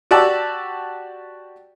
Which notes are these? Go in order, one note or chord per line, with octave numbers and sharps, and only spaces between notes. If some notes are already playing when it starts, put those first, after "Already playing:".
F#4 G4 D5 A5 E6